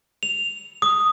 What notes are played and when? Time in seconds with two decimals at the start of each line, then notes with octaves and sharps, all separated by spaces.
0.23 F7
0.82 D#6